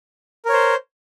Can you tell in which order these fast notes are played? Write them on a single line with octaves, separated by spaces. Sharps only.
A#4 C#5 C5